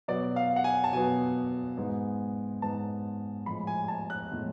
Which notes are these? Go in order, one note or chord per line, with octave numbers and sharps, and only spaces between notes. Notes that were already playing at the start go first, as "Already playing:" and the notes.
B2 F#3 B3 D5
F5
F#5
G#5
A5
B2 F#3 B3 G#5
G#2 G#3 B3
G#2 G#3 B3 A5
A2 F3 G#3 B5
G#5
G#5
A5
F#6
A2 F3 G#3